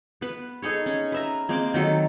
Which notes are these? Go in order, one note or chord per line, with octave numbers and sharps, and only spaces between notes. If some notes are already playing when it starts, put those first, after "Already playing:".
B3 B4
D#4 G#4 A4 C#5
C#4
B4 E5 A#5
G#3 A#3 C4 D6
D#3 F#3 A4